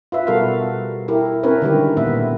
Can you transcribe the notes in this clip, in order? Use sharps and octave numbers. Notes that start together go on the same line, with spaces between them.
F4 B4 E5
B2 G3 F#4 A4 A#4 F5
E4 G4 A#4
C4 C#4 E4 A#4 B4 C#5
D3 D#3 G3 G#3 G4 A#4
A#2 B3 B4 E5